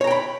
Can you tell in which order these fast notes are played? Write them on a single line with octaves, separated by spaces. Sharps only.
C#5 A#5 G5 B5